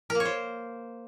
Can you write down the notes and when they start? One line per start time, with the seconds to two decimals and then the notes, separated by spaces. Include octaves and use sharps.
0.10 A#4
0.15 A#3
0.20 C#5
0.25 C5